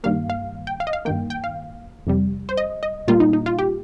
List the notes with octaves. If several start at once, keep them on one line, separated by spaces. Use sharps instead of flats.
G2 D#3 G3 A#3 F5
F5
G5
F5
D#5
F5
G2 D#3 A#3 G5
G5
F5
F2 C3 G3
C5
D#5
D#5
A#2 G3 A#3 F4
D#4
D#4
F4
G4